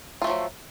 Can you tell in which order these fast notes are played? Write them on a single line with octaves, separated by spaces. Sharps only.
F4 A3 F3 F#3